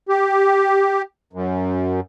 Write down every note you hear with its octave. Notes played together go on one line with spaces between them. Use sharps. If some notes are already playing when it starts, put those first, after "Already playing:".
G4
F#2